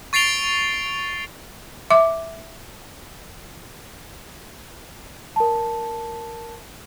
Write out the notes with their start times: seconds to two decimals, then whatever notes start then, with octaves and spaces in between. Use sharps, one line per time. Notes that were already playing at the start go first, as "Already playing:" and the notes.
0.13 C#6 A6 C7 D7 F7 G7
1.91 E5 D6
5.36 A#4 A5